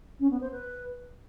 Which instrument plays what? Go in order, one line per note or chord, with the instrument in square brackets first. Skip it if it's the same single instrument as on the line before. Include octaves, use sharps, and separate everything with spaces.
[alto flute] C#4
B3
C5
B4